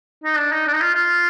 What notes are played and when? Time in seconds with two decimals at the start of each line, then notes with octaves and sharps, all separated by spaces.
0.24 D#4
0.38 D4
0.52 D#4
0.67 D4
0.74 D#4
0.81 F4
0.94 F4